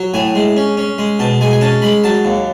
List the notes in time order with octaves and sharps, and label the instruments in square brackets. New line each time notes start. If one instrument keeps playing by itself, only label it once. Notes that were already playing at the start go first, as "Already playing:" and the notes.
Already playing: [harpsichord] F#3
A2 G#5
G#3
C#4
C#4
G#3
B2 A5
G#3 G#5
G#5
C#4 A5
G#3 B5
F#3 A5
D#2